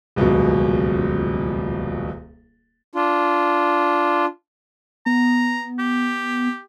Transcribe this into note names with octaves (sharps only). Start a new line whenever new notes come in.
D#1 C#2 F#2 B2
D4 F4
B3 A#5
G4